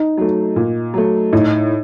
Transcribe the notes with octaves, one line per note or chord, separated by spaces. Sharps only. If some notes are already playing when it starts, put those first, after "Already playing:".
Already playing: D#4
F#3 A3
A#2
F#3 A3
A2 D#4